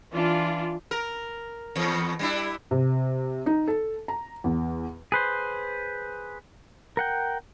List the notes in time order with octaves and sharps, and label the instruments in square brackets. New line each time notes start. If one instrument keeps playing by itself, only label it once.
[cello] E3 D4 [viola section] F4
[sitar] A#4
E2
G3 D4 E4
[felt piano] C3
D#4
A4
A#5
E2
[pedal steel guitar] G#4 B4 C5
A#4 F#5 G5